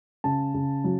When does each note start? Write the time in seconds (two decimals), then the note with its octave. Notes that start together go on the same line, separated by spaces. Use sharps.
0.24 C#3 A5
0.54 C#3
0.84 F#3